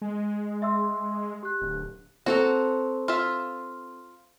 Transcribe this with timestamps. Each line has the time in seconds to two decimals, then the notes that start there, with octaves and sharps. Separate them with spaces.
0.02 G#3
0.62 E5 C6 E6
1.43 G4 F#6
1.61 D1
2.26 C4 F#4 A4 A#5
3.08 F4 E5